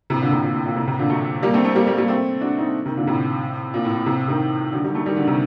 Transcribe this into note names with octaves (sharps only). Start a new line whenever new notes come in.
A2 C3
A#2 D3
A2 C3
A#2
A2
A#2
A2 C3
A2 C3
A#2 D3
F#3 A3
G3 A#3
A3 C4
A3 C4
G3 A#3
G3 A#3
G3 A#3
A3 C4
D4 F#4
C4 D#4
C3 D#3
A#2 D3
A2 C3
A#2
A2
A2
A2 C3
C3 D#3
D3 F#3
D#3 G3
F#3 A3
D#3 G3
D3 F#3
C3 D#3